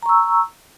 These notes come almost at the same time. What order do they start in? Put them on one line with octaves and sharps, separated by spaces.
A#5 C#6 E6